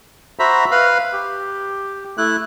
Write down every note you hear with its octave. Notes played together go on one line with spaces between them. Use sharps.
F#4 C5 E5 A#5 B5
B4 F5
G4
A3 E4 F#6